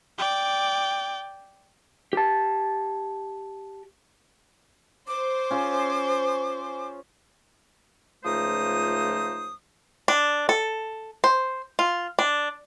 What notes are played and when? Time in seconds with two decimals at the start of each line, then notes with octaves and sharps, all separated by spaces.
0.18 D5 G5
2.13 G4 A5
5.08 C5 D6
5.50 C#4 F4 G#4
8.24 C#2 F3 A3 D#4 C5 D#6
10.08 D4
10.49 A4
11.24 C5
11.79 F4
12.19 D4